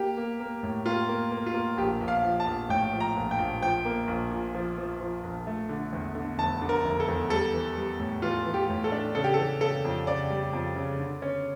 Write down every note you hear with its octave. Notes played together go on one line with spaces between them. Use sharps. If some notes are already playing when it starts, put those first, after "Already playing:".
Already playing: A#3 G4
A#3
A#3
A2
A#3 F4
A#3
A#3
F4
A#3
A#1 G4
A#1
F5
F3
A5
A#1
A2 G5
F3
A#5
A#1
G5
A#1
F3 G5
A#3
A#1
A#2
F3
F3
F3
A#1
A3
D3
E2
D3
F1 A5
D3
A#4
F1
A4
E2
G3 A4
E3
G3
A2
E3 F4
E3
G4
A2
A4
D4
C#3 A4
G4
E3 A4
C#3 A4
F2
C#3 D5
G3
F2
C#3
D3
C#4